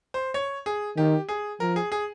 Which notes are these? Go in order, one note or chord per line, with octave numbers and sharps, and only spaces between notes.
C5
C#5
G#4
D#3 G4
G#4
F3 A#4
G#4
G#4